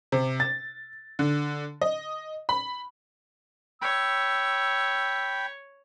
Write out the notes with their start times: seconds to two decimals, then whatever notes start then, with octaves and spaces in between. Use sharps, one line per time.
0.12 C3
0.40 A6
1.19 D3
1.81 D#5
2.49 B5
3.82 C#5 G5 B5 E6